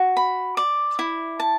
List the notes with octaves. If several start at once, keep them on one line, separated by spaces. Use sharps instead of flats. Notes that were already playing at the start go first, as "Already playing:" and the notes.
Already playing: F#4
B5
D5
E4
A5